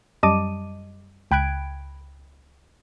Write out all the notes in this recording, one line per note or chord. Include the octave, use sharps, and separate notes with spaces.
F#2 G3 D#5 A5 D6 D#7
C#2 G5 B5 F#6 G#6 D7